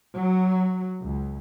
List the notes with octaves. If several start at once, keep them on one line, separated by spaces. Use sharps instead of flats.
F#3
C#2